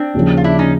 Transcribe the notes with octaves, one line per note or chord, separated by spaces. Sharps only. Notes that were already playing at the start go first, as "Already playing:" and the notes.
Already playing: C4 D4
D#2 C#3 F3
F4
D4 E4
C#4 D#4